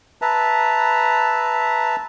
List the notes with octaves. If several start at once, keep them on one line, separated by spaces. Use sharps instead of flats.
B4 E5 A5 A#5